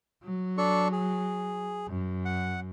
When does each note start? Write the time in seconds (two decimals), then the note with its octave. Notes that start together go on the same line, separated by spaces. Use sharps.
0.24 F#3
0.58 D4 A4 C#6
0.92 G#4
1.88 F#2
2.25 F#5